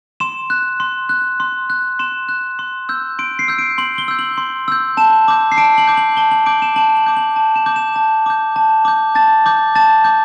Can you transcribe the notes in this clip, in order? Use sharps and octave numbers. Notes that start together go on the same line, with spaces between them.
C6 E7
F#6
C6
F#6
C6
F#6
C6 E7
F#6
C6
E6 G6
C6 D7
C7
E6 G6
D7
C6 F#7
G7
E6 G6
F#7
C6
E6 G6
A5 E7
D6 G6
C7
A5 D7
F#7
D6 G6
F#7
A5 G7
F#7
D6 G6 D7
E7
A5 F#7
F#7
D6 G6
F#7
A5
E7
D6 G6
E7
A5
D6 G6
A5
D6 G6
A5 A6
D6 G6
A5 A6
D6 G6